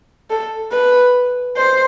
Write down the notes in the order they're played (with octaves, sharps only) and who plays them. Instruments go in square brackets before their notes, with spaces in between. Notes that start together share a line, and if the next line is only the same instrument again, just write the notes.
[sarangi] A4
B4
C5